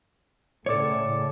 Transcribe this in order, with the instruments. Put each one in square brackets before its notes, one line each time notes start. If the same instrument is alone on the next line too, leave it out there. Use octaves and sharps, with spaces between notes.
[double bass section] A2 C#3 [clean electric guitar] A4 C#5 [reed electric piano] D5 D6